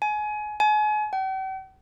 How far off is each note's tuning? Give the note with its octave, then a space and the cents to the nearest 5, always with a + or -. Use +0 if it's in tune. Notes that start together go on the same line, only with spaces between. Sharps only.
G#5 +25
G#5 +35
G5 -45